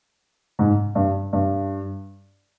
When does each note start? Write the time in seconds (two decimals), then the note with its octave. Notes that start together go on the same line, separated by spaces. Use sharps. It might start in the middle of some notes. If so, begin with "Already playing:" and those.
0.59 G#2
0.95 G2
1.33 G2